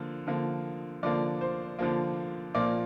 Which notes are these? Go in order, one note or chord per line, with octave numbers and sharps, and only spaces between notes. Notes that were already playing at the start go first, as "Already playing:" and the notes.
Already playing: D3 F3 A#3
D3 F3 A#3
D3 F3 A#3 D5
C5
D3 F3 A#3
A#2 F3 A#3 D5